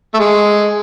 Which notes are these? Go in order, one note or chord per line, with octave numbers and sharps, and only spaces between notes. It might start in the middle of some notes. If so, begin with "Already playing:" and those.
A3
G#3